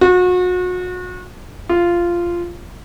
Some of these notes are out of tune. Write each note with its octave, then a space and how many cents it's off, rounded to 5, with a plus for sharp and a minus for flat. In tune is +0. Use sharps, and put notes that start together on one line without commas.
F#4 -35
F4 -10